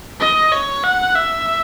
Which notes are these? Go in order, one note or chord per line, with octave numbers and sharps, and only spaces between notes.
D#5
C#5
F#5
E5